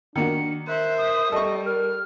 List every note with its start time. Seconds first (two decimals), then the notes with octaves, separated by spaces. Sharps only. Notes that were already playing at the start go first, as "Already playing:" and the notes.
0.16 D#3 A#3 D4 F#4 C#7
0.68 A#4 C5 E5 F#6
0.98 D#6
1.32 G3 A4 D#5 C#6
1.66 A#4 F6